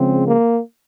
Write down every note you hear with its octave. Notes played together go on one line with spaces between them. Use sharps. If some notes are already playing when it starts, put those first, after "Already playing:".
Already playing: C#3 F3 G#3 C4
A#3